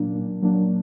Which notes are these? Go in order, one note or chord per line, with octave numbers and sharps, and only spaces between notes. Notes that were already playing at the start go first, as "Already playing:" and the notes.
Already playing: A#2 F#3 A#3 D4
A#2
F#3 A#3 D4